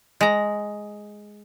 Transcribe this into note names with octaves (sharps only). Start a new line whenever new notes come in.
G#3 A#5